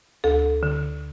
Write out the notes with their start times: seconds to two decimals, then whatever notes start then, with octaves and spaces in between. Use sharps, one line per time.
0.24 D2 A4
0.63 D3